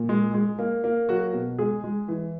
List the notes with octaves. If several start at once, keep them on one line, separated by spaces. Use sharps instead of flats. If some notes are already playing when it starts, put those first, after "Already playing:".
Already playing: A#2
G#3
G#3
A#3
A#3
F#3 F#4
B2
G#3 G#4
G#3
E3